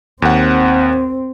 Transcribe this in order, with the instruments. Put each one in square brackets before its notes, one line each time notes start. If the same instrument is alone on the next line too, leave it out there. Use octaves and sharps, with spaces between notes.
[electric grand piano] D#2 F#5 [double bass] C4